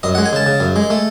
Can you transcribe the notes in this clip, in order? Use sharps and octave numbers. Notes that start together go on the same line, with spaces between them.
F#2 D#5
F#5
G#3
G#5
C#3 A5
C#3
F#2
G#3
A3